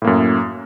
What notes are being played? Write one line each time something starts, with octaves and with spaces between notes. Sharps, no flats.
F#2 A2 A#3